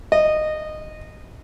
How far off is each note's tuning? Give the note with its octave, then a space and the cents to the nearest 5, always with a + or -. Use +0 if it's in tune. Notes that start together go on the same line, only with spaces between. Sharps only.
D#5 -15